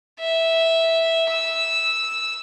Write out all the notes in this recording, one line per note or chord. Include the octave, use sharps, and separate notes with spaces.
E5
E6